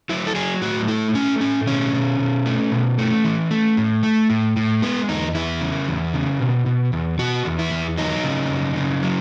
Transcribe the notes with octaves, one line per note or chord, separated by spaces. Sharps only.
F#3 E4
A4
F#3 G#4
A2 F#4
A3 E4
A3 C#4
A2 C#4
B2 C#4
B2
B2
A3
B2
A3
E3
A3
A2
A3
A2
A2
G#3 B3
E2 D#4
E2 E4
C#3
E2
C#3
B2
B2
E2
B2 F#4
E2
E4
E2
F#3 D#4
C#3
F#2
C#3
F#3